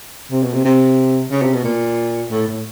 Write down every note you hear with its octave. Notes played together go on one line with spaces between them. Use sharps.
C3
B2
C3
C3
C#3
C3
B2
A#2
A2
A2